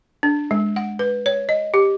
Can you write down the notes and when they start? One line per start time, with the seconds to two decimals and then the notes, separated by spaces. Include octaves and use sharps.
0.23 D4
0.51 G#3
0.76 F#5
0.99 B4
1.26 C#5
1.49 D#5
1.74 G4